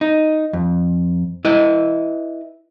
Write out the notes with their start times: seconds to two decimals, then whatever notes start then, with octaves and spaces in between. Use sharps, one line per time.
0.01 D#4
0.53 F2
1.45 E4 B4 D#5